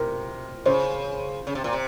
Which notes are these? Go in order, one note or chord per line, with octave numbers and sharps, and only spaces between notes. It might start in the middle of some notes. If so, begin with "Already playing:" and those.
Already playing: C3 A#4
C#3 C5
C#3
C3
A#2
C3